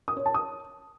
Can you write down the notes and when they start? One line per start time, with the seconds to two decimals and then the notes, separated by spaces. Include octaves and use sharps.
0.08 D#6
0.17 C#5
0.26 A5
0.34 D#6